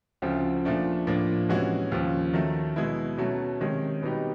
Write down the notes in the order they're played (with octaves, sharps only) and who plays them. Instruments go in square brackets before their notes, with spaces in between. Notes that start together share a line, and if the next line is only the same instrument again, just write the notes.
[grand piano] D2 C#3 F3 A3 C4
A#2 F3 A3 D4
A2 F3 A#3 D4
C3 E3 G#3 C#4 F#4
D#2 C#3 F3
D#3 F#3 A3
B2 G#3 B3 E4
B2 F#3 A3 C#4
C3 D#3 G#3 C#4
B2 G3 B3 D#4 G4